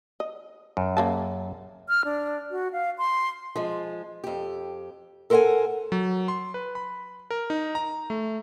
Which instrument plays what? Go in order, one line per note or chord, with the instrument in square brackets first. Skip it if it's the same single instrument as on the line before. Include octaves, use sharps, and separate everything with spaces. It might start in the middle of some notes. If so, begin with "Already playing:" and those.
[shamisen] D#5
[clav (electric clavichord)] F#2
[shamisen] C#3 A#3 A5
[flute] F6
D4
F#4
F5
C6
[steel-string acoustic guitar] F3 G#3
F2 G4
A4 A#4 C5 D#5 F#5 G#5
[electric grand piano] F#3
C6
B4
B5
A#4
D#4
A#5
A3